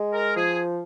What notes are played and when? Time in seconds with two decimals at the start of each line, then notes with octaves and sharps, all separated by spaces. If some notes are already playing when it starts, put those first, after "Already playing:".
Already playing: G#3
0.13 A#4
0.35 F3 G#4